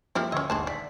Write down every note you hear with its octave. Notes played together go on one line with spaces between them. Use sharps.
F3 G3 G#3 A#3 E4
D2 C#4 D#5 C6 C#6 E6 G#6
D#1 G#1 D4 G#4 A5 C6
D5 B6